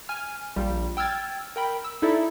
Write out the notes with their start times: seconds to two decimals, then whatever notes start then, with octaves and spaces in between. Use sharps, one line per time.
0.09 G#5 F6
0.56 A#1 F3 G3
0.97 G5 E6 F6 G#6 A6
1.56 A#4 G5 B5
1.84 E6
2.02 D#4 E4 A4 D5 E5